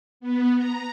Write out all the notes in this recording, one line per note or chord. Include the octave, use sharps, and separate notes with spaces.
B3
A#5